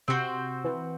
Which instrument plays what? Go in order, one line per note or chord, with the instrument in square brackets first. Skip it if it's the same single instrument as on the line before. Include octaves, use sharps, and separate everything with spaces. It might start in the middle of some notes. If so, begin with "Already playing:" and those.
[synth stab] C3 [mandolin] C4 F#4 C5
[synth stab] E3